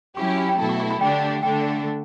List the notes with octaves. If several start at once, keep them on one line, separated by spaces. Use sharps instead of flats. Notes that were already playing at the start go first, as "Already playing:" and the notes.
F#3 C#4 E4 G4 C#6
C#6
B5
G5
B2 F#3 A3 E4 A4 A5
C#6
C#6
B5
D3 A3 D4 G4 G5
D3 A3 D4 A4 G5